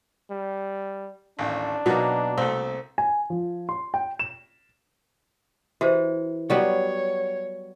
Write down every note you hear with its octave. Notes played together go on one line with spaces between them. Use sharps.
G3
A1 D#2 D4
B2 F#3 A#3 D#4
C2 A3 C4
G#5
F3
C6
G5
E7
E3 F#4 G4 C5
F#3 G3 B3 C#5